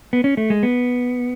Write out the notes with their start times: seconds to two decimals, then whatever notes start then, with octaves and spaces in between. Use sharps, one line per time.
0.13 B3
0.24 C#4
0.37 A3
0.50 G#3
0.63 B3